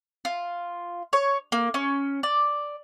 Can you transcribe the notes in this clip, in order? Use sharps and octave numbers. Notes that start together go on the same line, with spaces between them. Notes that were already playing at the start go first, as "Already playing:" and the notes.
F4
C#5
A#3
C#4
D5